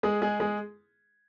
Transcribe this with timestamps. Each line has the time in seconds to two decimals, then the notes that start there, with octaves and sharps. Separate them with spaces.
0.03 G#3 G#4
0.22 G#3 G#4
0.40 G#3 G#4